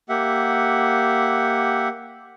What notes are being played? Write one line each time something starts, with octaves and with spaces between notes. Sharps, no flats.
A#3 G4 E5 F#5